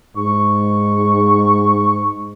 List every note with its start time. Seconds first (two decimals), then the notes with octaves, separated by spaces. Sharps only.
0.17 G#2 C#6